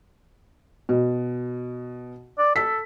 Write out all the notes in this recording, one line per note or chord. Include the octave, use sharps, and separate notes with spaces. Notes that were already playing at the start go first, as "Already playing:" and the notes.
B2
D5
A4 B6